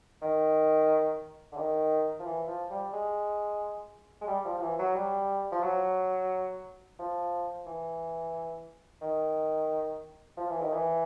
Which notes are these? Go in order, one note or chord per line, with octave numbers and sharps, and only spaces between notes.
D#3
D3
D#3
F3
E3
F3
G3
G#3
G#3
G3
F3
F3
E3
F#3
G3
F3
F#3
F3
E3
D#3
F3
E3
D#3
E3